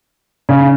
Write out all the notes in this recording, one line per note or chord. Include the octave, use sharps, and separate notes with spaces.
C#3